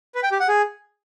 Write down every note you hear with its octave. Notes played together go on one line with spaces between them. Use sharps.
B4
G5
G4
F#5
G#4